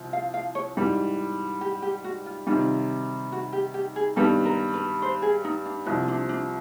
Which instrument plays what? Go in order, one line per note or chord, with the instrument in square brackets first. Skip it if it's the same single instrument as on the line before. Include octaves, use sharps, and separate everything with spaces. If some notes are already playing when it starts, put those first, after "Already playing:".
Already playing: [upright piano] C2 C3 F3
[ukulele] F5
F5
C#5
[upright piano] G#2 E3 G3 [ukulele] B4
[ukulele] G4
G4
F#4
F4
[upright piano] C3 D#3 G3 [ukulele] F4
[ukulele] F#4
G4
G4
G#4
[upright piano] G2 D#3 G3 B3 [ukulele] A4
[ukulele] A#4
B4
C5
G#4
D#4
D4
[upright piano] C2 C3 F3 [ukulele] D#4
[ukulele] D4
D4